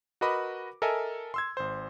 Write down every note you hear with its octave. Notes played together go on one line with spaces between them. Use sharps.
F#4 A#4 B4 D#5 B5 D6
A4 A#4 D#5 E5 G#5
C6 E6 G#6
G#1 C5